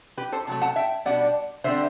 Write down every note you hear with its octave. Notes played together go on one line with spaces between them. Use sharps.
G4 B4
A4 C5
C3 F#3 A3
F#5 A5
E5 G5
B2 G3 D4 D5 F#5
D3 G3 C4 C5 E5